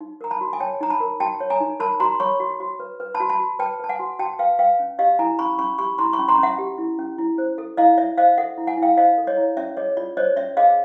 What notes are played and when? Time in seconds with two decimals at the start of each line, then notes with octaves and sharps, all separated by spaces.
0.01 D#4
0.21 A#4 A#5
0.31 A5 B5
0.41 F#4
0.53 G#5
0.60 C#5 G5 A5
0.81 D#4 A#5
0.90 A5 B5
1.00 A#4
1.20 F#4 G5 A5
1.40 C#5
1.50 G#5 A#5
1.60 D#4
1.80 A#4 A5 B5
2.00 F#4 A#5 C6
2.20 C#5 B5 C#6
2.40 F#4
2.60 F#4
2.80 B4
3.00 B4
3.15 A5 B5
3.20 F#4
3.30 A5 B5
3.40 F#4
3.59 B4 G5 A5
3.79 B4 A5
3.89 F#5 G#5
3.99 F#4
4.19 F#4 G5 A5
4.39 B4 F5 G5
4.59 B4 F5 G5
4.79 C#4
4.99 G4 D#5 F5
5.19 E4 G#5 A#5
5.39 C#4 B5 C#6
5.59 C#4 B5 C#6
5.78 G4 B5 C#6
5.98 E4 A#5 C6
6.13 B5 C#6
6.19 C#4
6.28 A#5 C6
6.38 C#4
6.43 E5 F#5
6.58 G4
6.78 E4
6.99 C#4
7.18 E4
7.38 C5
7.58 A4
7.77 E4 D#5 F5
7.98 E4 D5 E5
8.18 C5 D#5 F5
8.37 A4 E5 F#5
8.58 E4
8.67 F#5 G#5
8.77 E4
8.83 F5 G5
8.97 C5 D#5 F5
9.18 A4
9.27 C#5 D#5
9.37 E4
9.57 C#4 D5 E5
9.77 G#4 C#5 D#5
9.97 F4 D5
10.17 C5 C#5 D#5
10.37 C#4 D5 E5
10.57 G#4 D#5 F5